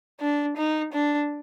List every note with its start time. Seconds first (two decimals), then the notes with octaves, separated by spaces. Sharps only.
0.20 D4
0.57 D#4
0.92 D4